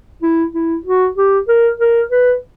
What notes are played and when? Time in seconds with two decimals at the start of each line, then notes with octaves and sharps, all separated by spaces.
0.22 E4
0.54 E4
0.86 F#4
1.17 G4
1.48 A#4
1.80 A#4
2.11 B4